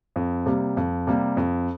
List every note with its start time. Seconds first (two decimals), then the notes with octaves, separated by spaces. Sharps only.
0.16 F2
0.46 C3 G3 A#3
0.77 F2
1.07 C3 G3 A#3
1.37 F2